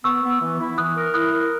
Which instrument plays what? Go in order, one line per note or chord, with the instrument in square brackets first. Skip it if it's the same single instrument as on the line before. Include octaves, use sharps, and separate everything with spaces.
[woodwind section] B3 [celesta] C#6 E6
[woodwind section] B3
E3
E4
[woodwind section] E3 [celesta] D#6 F#6
[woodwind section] A#4
[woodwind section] E4 [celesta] D#6 F#6
[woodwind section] A#4